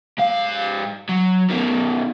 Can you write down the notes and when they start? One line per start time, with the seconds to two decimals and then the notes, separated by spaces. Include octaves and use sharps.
0.18 G#2 F5
1.09 F#3
1.50 B2 D#3